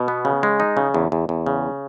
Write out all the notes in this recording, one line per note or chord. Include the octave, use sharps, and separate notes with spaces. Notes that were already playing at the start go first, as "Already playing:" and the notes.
Already playing: B2
B3
C#3
G#3
D#4
C#3
E2
E2
E2
C#3